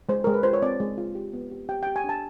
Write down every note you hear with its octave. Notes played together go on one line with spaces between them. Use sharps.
G#3 C5
G#3 A#4
B4
F4 C5
C#5
C4 D5
G#3
F4
G4
B3
G4
G4 G5
G5
G4
G#5
D4
A5